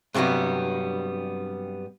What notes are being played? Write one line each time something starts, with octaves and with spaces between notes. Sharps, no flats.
G2 C3 F#3 G3 B3